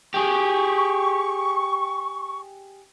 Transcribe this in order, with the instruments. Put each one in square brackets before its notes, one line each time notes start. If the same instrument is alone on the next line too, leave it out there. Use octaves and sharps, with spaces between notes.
[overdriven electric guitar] G4 G#4 [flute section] C#6